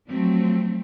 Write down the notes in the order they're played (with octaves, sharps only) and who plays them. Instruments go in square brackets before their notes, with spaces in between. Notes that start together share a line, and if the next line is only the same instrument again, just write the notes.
[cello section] F3 F#3 A3 C4